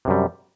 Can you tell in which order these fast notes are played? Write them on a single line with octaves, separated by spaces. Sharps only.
C3 F#2 G3